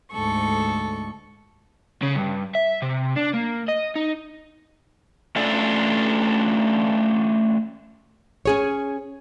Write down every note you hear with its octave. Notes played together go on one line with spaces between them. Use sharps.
D2 G#2 A4 C#6
C#3
G2
E5
C3
D4
A#3
D#5
D#4
A3 C#4 D4 F4 A4 D5
C#4 G#4 C#5